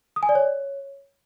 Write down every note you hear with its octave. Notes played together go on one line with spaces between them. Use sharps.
D#6
G#5
D5
C#5